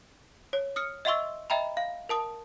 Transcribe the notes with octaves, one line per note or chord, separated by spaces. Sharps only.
C#5
D#6 F6 C#7
D#5 E5 F#5 C6 C#6 E6
D#5 E5 G5 A#5 B5
F5
A#4 A5 D#6